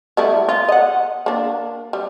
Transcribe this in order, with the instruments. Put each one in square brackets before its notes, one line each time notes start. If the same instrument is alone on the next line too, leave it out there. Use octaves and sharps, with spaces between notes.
[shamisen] G3 A3 E4
F4
D#5 F#5
A#3 D4
G3